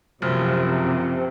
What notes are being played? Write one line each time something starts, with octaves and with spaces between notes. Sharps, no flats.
F#1 C3 F3 F#3 F6